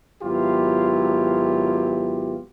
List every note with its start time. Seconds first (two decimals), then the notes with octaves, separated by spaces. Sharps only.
0.23 G#1 F#3 B3 E4 F4 G4